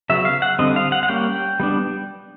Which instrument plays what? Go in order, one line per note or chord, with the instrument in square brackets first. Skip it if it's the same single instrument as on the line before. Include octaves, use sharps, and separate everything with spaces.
[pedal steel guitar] C#3 F#3 B3 E5
F5
F#5
D3 G3 C4 D#5
F5
F#5
F#5
G3 A#3 C#4 G5
G3 B3 D4